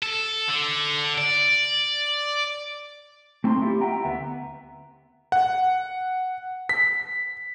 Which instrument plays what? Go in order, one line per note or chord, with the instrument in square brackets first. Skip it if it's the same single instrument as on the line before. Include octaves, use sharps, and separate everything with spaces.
[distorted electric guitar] A4
D3
D5
[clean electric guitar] A3 C4 D#4 A5 C6
C4 E4 F4 G4
E5 F#5 G5 A#5
D2 B3 E5
[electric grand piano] F#5
B6